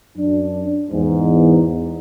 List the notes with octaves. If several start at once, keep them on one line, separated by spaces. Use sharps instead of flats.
F#2 D4
E2 G#2